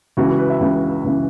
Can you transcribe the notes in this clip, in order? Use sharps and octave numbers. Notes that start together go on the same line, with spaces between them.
C#2 C#3 E3 F#4
F#4
B4
E5
C#2 C#3 E3
C#2 C#3 E3